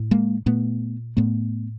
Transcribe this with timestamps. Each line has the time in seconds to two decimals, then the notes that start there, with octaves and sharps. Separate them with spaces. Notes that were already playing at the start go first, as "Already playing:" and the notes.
Already playing: A2
0.11 G#3 A#3
0.46 A#2 A3 B3
1.17 A2 A3 B3